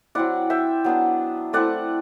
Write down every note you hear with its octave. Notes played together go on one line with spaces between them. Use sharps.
F#3 C4 E4 D5 F#5
E5 G5
F#3 B3 D4
A3 C4 E4 D5 F#5